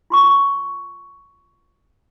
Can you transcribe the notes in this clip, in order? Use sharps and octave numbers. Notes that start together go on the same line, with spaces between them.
F4 C6 C#6